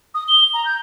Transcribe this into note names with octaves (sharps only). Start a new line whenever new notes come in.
D#6
G7
A#5
G6